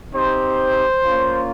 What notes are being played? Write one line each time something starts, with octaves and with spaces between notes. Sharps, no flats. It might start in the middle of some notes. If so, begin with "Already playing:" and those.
C4 D#4 G4 C5
A#3 C#4 F4